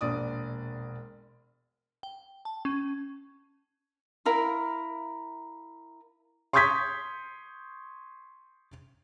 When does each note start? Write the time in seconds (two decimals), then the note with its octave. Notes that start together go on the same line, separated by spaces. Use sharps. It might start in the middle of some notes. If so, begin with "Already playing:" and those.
0.01 E1 A#1 D5 D#6
2.03 G5
2.45 A5
2.65 C#4
4.25 E4 A#4 F5 C6
6.53 C6 C#6 D#6 G6 G#6 B6